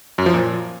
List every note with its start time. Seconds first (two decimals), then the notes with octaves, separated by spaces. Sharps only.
0.18 F#2
0.26 F3
0.34 A#2